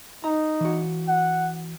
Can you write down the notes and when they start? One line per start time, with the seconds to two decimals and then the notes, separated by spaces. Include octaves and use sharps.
0.24 D#4 A#5
0.61 E3 F#4
1.08 F#5